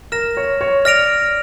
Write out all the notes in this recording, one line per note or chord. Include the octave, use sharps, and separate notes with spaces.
A#4 F6 A#6 E7
C#5
C#5
D5 F6 A#6 D7 F7